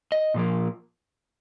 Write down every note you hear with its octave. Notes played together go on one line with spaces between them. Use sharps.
D#5
A#2 F3 A#3